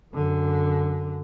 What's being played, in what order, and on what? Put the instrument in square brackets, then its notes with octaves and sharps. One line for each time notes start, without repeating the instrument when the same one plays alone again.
[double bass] F#2 D3